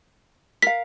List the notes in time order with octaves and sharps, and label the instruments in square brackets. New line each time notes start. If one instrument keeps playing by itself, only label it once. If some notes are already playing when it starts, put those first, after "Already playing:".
[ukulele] A#4 F5 [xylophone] B6